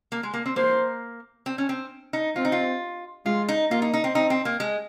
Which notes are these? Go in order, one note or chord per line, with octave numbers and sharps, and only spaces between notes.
A#3
G#3
A#3
C4
A#3 C5
C4
C#4
C4
D#4
C4 F4
D#4
F4
G#3 F4
D#4
A#3 F4
D#4
D#4
C4
C4 D#4
C4
A#3
G#3